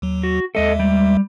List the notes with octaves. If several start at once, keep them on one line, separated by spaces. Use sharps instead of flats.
D#2 F#3
F#4
D#2 G#3 A4 D#5 E5
G3